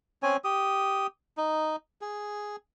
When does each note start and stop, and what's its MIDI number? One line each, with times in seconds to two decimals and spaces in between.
0.23 0.37 60
0.23 0.37 61
0.23 0.37 73
0.23 0.37 80
0.44 1.07 67
0.44 1.07 87
1.37 1.76 63
2.01 2.56 68